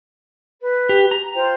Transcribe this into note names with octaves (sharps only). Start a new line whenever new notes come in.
B4
G4
A#5
F4 C5 G5